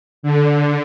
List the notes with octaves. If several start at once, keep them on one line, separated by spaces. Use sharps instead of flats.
D3